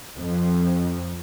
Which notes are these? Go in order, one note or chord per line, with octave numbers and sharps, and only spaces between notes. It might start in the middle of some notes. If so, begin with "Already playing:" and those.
F2